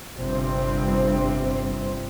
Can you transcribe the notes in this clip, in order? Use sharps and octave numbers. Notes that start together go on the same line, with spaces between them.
G1 G2 C3 C4